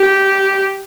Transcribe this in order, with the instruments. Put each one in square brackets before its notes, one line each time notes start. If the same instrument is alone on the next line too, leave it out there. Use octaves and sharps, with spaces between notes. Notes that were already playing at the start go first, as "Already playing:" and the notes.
Already playing: [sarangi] G4